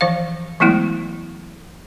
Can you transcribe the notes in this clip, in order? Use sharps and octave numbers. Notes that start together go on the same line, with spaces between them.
E3 F3 C5 F5
E3 F#3 G#3 A3 B3 E4